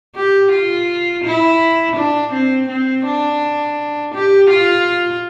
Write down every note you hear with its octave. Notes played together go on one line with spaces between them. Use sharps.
G4
F4
E4
D4
C4
C4
D4
G4
F4